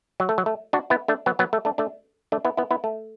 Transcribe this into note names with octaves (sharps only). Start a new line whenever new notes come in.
F#3
A3
F#3
A3
D4 F#4
B3 E4
A3 D4
F#3 B3
F#3 B3
A3
A3 D4
A3 D4
A3 D4
B3 E4
B3 E4
B3 E4
A3